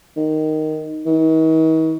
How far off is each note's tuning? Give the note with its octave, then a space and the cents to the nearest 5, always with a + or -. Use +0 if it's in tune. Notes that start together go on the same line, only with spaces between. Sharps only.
D#3 +0
D#3 +45